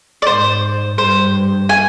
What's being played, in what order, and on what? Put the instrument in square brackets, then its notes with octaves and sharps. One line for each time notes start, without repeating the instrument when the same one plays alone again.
[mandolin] D5
[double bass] G#2 [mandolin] C5
[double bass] G2 [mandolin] C5
[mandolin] G#5